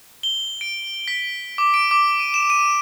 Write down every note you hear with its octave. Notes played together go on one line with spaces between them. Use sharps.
G7
D7
B6
D6
D7
D6
D#7
E7
D#7